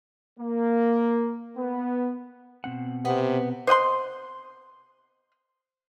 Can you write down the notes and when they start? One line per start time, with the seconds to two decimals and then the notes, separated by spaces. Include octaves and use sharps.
0.39 A#3
1.57 B3
2.64 B2 C4 F#5
3.05 C3 B3
3.67 C5 D#5 F#5 C6